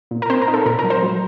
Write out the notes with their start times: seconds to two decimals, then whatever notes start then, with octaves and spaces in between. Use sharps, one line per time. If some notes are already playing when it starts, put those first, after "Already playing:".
0.11 A#2
0.22 A#4
0.30 C4 C5
0.42 A#4
0.48 D#4
0.54 A4
0.66 A#2 A#4
0.79 A#4
0.84 F#3
0.90 C5
1.03 F#3